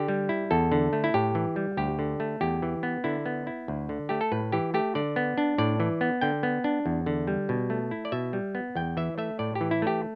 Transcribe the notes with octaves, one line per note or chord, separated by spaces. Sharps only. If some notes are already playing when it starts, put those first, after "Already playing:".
Already playing: D3 G4
G3
E4
E2 A4
D3
A3
E4
A2 G4
E3
G3
D2 G4
D3
A3
E2 G4
E3
B3
D3 E4
B3
E4
D2
D3
A3 G4
A4
A2 B4
E3 G4
A3 G4
D3 D5
B3
D4
A2 D5
E3
B3
D3 G5
B3
D4
E2
D3
G3
B2
A3
E4
D5
B2 E5
G3
B3
E2 G5
E3 E5
A3 E5
A2 D5
G4
E3
E4
A3 G4